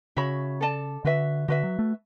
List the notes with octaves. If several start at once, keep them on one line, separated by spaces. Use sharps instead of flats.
C#3 F#4 C#5 E5 B5
A4 D5 A5
D3 F#4 B4 E5
D3 F#4 B4 E5
F#3
A3